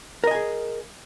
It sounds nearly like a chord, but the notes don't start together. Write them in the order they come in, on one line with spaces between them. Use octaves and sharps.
A#4 D#5 G#5 G#4